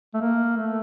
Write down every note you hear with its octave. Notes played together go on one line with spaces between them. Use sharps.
A3
A#3
A3